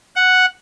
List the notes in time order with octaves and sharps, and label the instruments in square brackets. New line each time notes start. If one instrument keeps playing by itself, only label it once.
[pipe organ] F#5